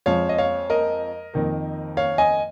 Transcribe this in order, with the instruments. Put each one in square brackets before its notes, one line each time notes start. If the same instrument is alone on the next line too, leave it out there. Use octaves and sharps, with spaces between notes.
[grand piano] F2 F3 G#3 C#5 F5
D#5
C#5 F5
A#4 D#5
F2 D#3 A#3
C#5 F5
D#5 G#5